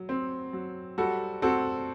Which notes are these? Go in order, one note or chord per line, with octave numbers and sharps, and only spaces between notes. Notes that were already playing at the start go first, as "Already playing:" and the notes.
Already playing: F#3
C4
F#3
G3 F#4 A4
C4 F#4 A4